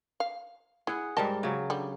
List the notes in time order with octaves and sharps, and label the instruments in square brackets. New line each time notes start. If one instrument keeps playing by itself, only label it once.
[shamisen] F5
[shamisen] E4 [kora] G#4 F#5
[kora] G#2 G3 A#4 [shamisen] D#5 A5
[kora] C#3 F#3
[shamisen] D3 G3